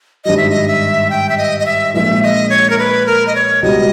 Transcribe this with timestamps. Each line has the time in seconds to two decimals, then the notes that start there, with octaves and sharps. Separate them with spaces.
0.25 G#1 G2 G3 D#5
0.37 E5
0.50 D#5
0.68 E5
1.10 G5
1.29 E5
1.37 D#5
1.60 D#5
1.66 E5
1.94 A#1 A#2 G#3 E5
2.23 D#5
2.50 C#5
2.70 A#4
2.78 B4
3.06 A#4
3.27 D#5
3.35 C#5
3.62 C#2 B2 G3 D#5